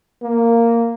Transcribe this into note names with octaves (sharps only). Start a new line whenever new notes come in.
A#3